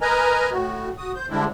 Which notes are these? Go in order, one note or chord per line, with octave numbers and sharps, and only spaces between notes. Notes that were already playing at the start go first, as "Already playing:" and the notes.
A#4 B4 D#5 G#5 A#5
A2 F#4
F#4 D#6
C5 G6
D3 G3 G#3 C4 D4 E4